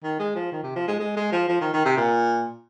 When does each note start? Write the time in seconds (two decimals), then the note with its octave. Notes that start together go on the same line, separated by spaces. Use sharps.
0.03 D#3
0.19 G#3
0.35 F3
0.52 D#3
0.63 C3
0.76 F3
0.88 G#3
1.00 G#3
1.17 G#3
1.32 F3
1.48 F3
1.61 D#3
1.73 D#3
1.85 C3
1.97 A#2